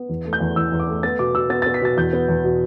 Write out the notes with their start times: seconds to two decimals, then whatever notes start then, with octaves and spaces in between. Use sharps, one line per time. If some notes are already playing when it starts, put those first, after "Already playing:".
Already playing: B3
0.09 E2
0.25 A3
0.33 G6
0.41 E2
0.56 E3 E6
0.72 E2
0.80 D6
0.88 A3
1.03 B3 A6
1.19 B2 D6
1.35 B2 E6
1.50 B3 A6
1.62 B3 A6
1.74 B6
1.82 B2 A6
1.97 E2 G6
2.13 B3
2.28 E2
2.44 B2